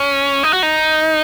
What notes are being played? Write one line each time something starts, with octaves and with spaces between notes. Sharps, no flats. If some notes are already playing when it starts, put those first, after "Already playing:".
Already playing: C#4
D#4
F#4
D#4